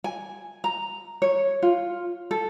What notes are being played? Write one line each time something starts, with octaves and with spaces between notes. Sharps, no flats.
G#5
A#5
C#5
F4
A4